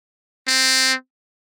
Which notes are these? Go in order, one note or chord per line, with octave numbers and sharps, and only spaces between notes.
C4